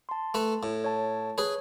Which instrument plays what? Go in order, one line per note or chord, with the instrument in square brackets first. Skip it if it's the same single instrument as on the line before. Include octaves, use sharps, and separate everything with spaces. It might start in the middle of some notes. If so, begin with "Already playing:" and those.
[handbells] A5 C6
[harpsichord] A3 B4
A2
[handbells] C#5 A5
[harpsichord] G#4 B4 [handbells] C#5